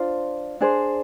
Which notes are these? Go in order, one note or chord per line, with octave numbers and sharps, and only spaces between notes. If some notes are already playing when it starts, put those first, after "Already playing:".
Already playing: D4 F4 C5
D4 G#4 C5